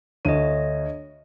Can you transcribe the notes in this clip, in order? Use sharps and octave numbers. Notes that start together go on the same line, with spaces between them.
D2 C#5 D#5 D#7